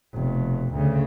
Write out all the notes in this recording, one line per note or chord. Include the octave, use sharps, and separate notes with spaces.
F1 B2
D2 C#3